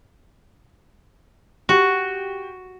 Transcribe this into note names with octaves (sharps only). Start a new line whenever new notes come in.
F#4 G4